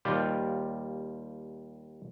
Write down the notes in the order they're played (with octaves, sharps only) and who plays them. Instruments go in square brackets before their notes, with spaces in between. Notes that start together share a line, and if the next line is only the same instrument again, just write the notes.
[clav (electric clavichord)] D#2 G3 F4 G4 C5